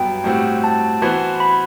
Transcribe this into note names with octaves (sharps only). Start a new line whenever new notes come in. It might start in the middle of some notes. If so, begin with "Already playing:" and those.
Already playing: G2 F#3 B3 G5
A2 G3 C4 F#4
A5
E3 B3 F#4 C5
B5